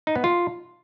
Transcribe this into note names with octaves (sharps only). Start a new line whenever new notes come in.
D#4
B3
F4